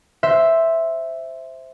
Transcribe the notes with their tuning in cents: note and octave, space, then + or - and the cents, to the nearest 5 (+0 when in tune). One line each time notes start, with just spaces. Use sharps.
C5 +0 E5 +0